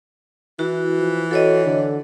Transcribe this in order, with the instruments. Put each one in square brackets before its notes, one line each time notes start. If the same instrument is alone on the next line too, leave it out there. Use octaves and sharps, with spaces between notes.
[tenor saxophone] E3 [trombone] E4 [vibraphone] F#4
[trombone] F3
[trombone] F#4 [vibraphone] A4 C#5 D#5
[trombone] D3